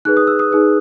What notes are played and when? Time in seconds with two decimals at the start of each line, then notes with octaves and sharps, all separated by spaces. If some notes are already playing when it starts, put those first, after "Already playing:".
0.05 D#4 G#4 B4 F#6
0.17 D#6
0.27 E6
0.39 D#6
0.51 D#4 G#4 B4